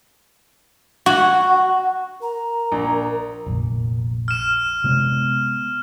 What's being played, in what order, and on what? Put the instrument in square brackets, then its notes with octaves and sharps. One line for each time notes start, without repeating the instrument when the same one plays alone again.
[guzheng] F#4
[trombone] A#4 [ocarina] A#5
[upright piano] A#1
[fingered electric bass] F1 A#1
[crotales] F6 E7
[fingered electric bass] C3 G#3 B3